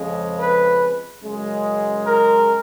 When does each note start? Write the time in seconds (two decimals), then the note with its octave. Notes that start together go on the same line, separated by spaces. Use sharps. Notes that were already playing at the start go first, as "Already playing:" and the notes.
Already playing: F2 C#3 F3 G#3
0.39 B4
1.21 F#2 C#3 G#3
2.05 A#4